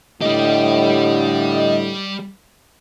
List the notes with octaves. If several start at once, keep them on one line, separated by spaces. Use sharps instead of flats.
A2 D3 G3 G4 D#5